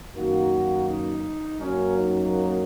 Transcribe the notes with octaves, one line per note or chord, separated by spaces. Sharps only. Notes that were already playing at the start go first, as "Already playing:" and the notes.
F#2 D#3 A#3 F#4
D#4
F#2 F#3 A#3 C#4
D#4